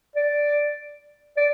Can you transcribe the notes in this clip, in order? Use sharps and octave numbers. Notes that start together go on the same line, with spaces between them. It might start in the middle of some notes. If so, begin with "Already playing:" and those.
D5
D5